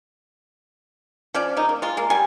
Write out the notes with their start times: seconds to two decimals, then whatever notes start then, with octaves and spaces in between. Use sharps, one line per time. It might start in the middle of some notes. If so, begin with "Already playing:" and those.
1.34 F3 C#4 D5
1.57 C#3 D#4
1.69 A#3
1.82 G#3 F4
1.97 G#3 A#3
2.10 G3 G#5